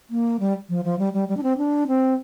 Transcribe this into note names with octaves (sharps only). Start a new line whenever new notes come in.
A#3
G3
F3
F3
G3
G3
G3
D4
C4
D4
C4